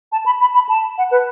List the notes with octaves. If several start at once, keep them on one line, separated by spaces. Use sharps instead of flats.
A5
B5
B5
B5
A5
F#5
B4